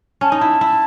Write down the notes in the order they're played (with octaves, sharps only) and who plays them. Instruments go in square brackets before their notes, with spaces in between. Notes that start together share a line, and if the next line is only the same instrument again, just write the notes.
[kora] C#4 [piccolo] A5
[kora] D#4 [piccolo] G#5
[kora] E4 [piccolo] A5
[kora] E4